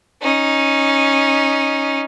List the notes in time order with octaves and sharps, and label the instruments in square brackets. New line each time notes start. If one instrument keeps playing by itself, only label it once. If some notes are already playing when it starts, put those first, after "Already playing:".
[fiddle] C#4 D#4